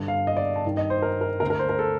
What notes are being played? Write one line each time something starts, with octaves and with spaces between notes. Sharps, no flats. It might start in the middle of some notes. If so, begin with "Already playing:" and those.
Already playing: G2 D3
F5
D#5
D5
A5
G2 D#3
D#5
C5
A#4
A#4
D2 D3 A#4
A#4
C5
A#4
A4